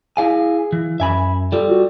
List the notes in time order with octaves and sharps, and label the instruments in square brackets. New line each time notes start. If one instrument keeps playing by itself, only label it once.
[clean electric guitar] E4 F5 G#5 [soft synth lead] G#4
[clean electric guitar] E3
[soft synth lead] F#2 [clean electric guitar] E5 G#5 B5
[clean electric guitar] G3 A4 [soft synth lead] F4
[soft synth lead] F#4